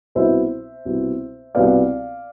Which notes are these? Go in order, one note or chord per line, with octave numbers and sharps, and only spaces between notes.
C2 B2 B3 E4 C5 E5
C2 B2 B3 E4
C2 B2 B3 E4 D5 F5